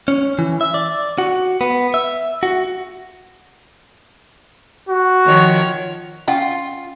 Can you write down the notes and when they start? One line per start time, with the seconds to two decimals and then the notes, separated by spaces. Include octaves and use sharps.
0.08 C#4
0.39 E3
0.61 E5
0.74 D5
1.18 F#4
1.61 B3
1.94 E5
2.43 F#4
4.89 F#4
5.26 D#3 F3 C#5
6.28 C#4 F4 F#5 G5